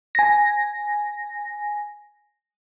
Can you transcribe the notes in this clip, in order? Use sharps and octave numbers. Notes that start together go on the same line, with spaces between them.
G#5 A#6